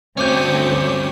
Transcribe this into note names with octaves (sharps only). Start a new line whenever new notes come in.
D2 G2 C4 C#4 C#5 D6 G6